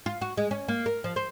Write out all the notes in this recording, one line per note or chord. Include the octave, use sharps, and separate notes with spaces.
F4
F#4
G#3
C#4
A#3
A#4
F3
C5